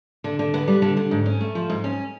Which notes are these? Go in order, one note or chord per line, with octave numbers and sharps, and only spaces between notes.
D3
D3
B3
G3
D3
D3
G#2
C#4
A3
F3
G#2
C#4